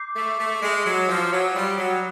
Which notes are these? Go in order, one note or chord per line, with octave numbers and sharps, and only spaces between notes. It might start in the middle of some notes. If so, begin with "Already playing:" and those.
Already playing: D6 G6 C7
A3
A3
G#3
F#3
F3
F#3
G3 C6 D#6 F#6 A6
F#3